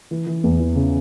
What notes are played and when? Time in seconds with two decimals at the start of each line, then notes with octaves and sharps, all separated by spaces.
0.11 E3
0.27 E3
0.44 E2
0.60 E3
0.76 C#3